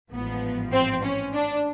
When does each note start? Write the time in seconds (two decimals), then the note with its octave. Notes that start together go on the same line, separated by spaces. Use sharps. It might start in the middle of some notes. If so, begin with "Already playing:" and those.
0.11 A1 G#2 F3 B3
0.72 C4
1.03 C#4
1.33 D4